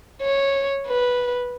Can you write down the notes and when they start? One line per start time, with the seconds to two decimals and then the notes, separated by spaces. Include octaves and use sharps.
0.22 C#5
0.86 B4